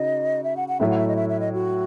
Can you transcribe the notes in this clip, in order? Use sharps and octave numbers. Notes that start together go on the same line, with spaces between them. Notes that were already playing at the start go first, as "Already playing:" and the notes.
Already playing: C#3 D#4 F#4 D#5
E5
F#5
F#5
A2 F#3 A3 E4 E5
F#5
E5
D#5
E5
E5
D#5
F#4